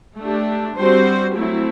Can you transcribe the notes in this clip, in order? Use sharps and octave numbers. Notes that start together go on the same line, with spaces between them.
A3 D4 G4
G3 C4 F#4 C5
F#3 A3 C4 E4